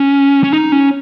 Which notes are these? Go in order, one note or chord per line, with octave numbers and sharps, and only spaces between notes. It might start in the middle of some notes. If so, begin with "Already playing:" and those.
Already playing: C#4
C#4
D#4
C#4